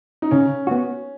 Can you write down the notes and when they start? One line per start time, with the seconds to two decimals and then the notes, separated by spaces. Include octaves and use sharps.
0.22 D#4
0.31 C#3 C#4
0.67 B3 F#4